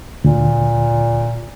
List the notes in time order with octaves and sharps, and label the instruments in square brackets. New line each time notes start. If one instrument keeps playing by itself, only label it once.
[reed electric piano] D2 [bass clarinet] A#2